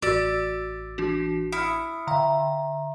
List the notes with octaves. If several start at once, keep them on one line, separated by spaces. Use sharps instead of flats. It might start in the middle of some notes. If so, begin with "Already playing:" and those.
A1 F#4 D5 E6 A6
E3 D4 F#4
E4 D#6 F6 C#7
D3 E5 F5 A#5